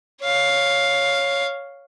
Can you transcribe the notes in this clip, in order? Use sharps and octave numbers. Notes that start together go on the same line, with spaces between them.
C#5 F5